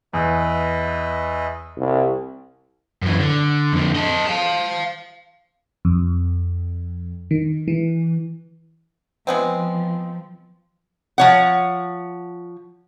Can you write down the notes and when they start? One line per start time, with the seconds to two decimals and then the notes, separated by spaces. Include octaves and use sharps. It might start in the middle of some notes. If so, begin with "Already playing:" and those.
0.13 E2 B4 D#5 E5
1.77 C2
3.02 F#2 E3
3.20 D3
3.73 F2 D3
3.96 A4 D#5
4.27 F5 A5
5.85 F2
7.31 D#3
7.68 E3
9.27 F3 G#3 B3 C4
11.18 F3 C#5 F#5